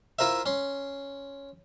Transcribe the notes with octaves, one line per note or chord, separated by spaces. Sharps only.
E4 F4 A#4 C5 E5
C#4 C6